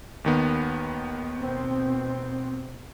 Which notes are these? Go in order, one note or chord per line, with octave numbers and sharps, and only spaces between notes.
D#2 D#3 B3
B2 C4